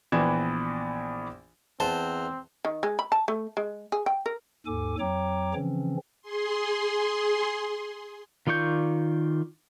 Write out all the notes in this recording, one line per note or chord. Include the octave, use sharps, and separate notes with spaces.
A#1 E3 B3 G#6 E7
E2 C4 C5 A5
D#3
G#3
B5
A5
A3
G#3
G#4
G5
A#4
D#2 G#2 A4 G#5 D6
F2 F#3 C#5 G5 A#5 D6
C#3 E3 F3 C4 C#4
G#4 C6
D#3 F4 D5 C#6 G6